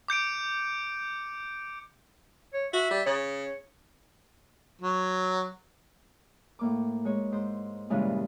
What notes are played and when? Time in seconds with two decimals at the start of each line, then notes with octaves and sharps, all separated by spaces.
0.08 D6 G6 C#7 D7
2.54 C#5
2.73 F#4 E5
2.91 G3
3.06 C#3 C#5
4.82 F#3
6.59 A2 A#3 D6
7.05 G#3 C#5
7.32 G#2 C5
7.90 G2 A#2 C#3 E3 G#3 C#4